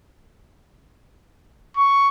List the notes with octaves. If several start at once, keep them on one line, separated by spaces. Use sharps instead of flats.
C#6